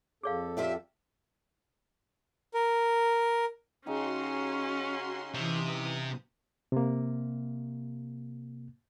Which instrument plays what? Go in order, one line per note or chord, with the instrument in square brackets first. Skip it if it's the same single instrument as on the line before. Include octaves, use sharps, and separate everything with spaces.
[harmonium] F2 A4 [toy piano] G#4 C#5 F5
[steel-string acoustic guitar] F4 G4 D5 [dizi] E5
[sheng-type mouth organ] A#4
[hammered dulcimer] C#3 D#4 G4 [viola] C#4 [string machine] F#4 C6
[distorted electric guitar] C3 [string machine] E3 D#6
[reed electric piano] C3 A#3